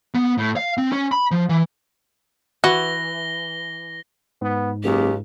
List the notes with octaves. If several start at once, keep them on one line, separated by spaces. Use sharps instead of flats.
B3
A2
F5
C4
C#4
B5
F3
E3
E3 F#4 A#6 G7
G#2 B3
F#1 C#2 G4